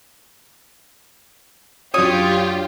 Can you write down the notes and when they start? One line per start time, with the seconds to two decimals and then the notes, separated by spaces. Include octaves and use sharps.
1.94 F#2 F#3 D4 F4 G4 C#5 D#6